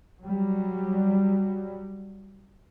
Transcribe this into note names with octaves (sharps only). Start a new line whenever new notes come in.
F#3 G3